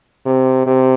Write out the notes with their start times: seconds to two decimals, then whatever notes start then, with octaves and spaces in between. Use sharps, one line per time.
0.26 C3
0.66 C3